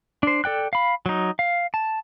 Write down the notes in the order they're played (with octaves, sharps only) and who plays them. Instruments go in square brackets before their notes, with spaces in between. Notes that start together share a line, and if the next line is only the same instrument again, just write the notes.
[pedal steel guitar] D4 C5
A4 D5 G5 F#6
F5 B5
F#3 D#4
F5
A5